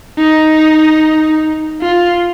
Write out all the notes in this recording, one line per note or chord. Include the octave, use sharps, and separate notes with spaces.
D#4
F4